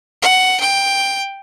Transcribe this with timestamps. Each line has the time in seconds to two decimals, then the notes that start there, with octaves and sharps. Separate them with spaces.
0.22 F#5
0.61 G5